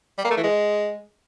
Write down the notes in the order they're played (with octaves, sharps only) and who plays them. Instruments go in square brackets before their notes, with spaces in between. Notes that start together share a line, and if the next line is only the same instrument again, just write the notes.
[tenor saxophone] G3
A#3
A3
E3
G#3